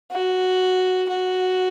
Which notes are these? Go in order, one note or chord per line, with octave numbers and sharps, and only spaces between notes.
F#4
F#4